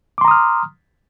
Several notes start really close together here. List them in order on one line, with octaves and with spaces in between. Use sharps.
D6 C6 A#5 D#6 F6